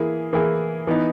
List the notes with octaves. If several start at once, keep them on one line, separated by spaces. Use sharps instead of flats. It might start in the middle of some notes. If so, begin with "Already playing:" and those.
Already playing: E3 A#3 E4 G#4
E3 A#3 E4 G#4
E3 B3 D#4